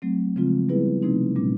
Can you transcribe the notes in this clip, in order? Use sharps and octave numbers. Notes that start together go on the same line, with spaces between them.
F#3 A3 C4
C#3 F3 G#3 C4 F4
G3 B3 E4 G#4 B4
C3 F3 A3 C4 D#4
A#2 G3 A#3 C#4